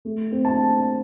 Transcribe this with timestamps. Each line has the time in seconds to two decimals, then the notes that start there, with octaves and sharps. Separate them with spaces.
0.05 A3
0.32 C4
0.45 A5